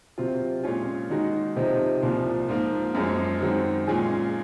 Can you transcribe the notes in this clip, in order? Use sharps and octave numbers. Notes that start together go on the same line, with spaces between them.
C3 F#3 C4 F4
A#2 G#3 C#4 F4
D#3 G#3 D#4 F#4
C3 F3 C4 D#4
C2 A#2 F3 A#3
G#2 F3 A#3
F#2 F3 G#3 C#4
F#2 D#3 G#3 C4 F#4
A#2 G#3 C#4 F4 G#4